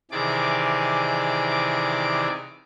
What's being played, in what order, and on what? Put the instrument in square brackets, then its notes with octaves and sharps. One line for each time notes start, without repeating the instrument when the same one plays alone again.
[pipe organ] C3 D#3 E3 G#4 D5 D6